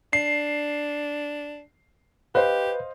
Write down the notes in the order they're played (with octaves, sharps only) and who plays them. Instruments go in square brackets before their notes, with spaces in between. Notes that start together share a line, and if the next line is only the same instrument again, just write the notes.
[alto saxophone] D4 [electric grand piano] C7
[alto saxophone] G4 [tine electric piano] B4 [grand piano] C5 D#5 F5